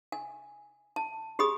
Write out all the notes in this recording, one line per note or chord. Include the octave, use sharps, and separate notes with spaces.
G#5
A5
G4 G#4 B5 D#6